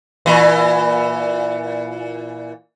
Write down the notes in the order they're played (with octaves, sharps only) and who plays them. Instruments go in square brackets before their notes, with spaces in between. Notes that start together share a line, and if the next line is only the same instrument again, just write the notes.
[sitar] A#2 E3